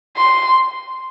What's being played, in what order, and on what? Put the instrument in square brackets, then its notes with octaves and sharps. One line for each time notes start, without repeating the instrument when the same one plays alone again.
[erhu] C6